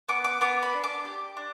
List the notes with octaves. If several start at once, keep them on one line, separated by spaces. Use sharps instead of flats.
B3 D6
D6
B3 D6
B5
D4
D6
G4
D4